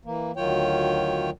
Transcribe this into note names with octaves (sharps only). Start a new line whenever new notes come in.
E3 A#3
D2 D#3 F#3 F4 C#5 G5